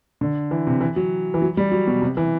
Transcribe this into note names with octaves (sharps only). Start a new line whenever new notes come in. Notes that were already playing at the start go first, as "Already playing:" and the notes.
D3
E3
C3
E3
F#3
E3
F#3
G3
F#3
B2
C3
E3